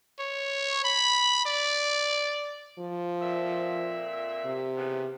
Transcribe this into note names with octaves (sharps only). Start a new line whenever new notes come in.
C#5
B5
D5
F3
F2 A#2 E5
C3
C#3 E3 B3